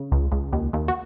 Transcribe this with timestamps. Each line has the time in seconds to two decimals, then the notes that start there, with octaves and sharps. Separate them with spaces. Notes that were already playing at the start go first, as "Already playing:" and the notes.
Already playing: C#3
0.12 C#2
0.32 C#2
0.53 D#2
0.73 D#2
0.88 F#4